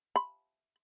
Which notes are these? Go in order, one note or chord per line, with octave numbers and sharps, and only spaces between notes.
B5